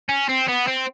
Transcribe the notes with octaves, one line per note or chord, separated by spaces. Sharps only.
C#4
C4
B3
C4